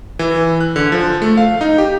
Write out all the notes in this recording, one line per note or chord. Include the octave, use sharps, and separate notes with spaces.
E3
F#6
D3
F3
A3
F5
D#4
G4